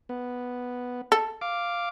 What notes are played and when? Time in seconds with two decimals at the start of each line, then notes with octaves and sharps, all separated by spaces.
0.09 B3
1.12 A4
1.41 F5 D6